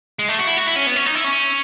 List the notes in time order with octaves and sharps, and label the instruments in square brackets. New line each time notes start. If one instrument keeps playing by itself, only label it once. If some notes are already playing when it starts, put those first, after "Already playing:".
[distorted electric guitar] G#3
A3
F#4
E4
F#4
E4
C#4
B3
C#4
D#4
E4
C#4